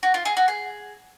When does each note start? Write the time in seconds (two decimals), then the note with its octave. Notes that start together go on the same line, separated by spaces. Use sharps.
0.03 F#4
0.14 F4
0.25 G#4
0.37 F#4
0.48 G#4